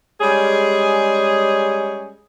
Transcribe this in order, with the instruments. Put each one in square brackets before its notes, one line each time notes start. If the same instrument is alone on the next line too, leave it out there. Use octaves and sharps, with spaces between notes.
[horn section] G3 G#3 C#4 G#4